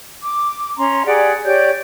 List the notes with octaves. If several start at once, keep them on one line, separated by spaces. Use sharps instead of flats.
D6
C#4 A#5 C6
G4 G#4 D5 F#5
G4 C#5 D5 G6